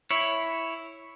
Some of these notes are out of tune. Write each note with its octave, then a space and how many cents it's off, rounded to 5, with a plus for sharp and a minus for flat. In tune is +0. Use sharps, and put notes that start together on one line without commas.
E4 +0 C#5 +0